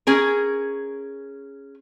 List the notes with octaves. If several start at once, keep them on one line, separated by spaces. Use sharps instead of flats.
C#4 G#4 A#4